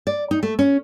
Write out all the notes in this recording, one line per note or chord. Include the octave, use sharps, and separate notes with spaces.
D5
D#4
A3
C#4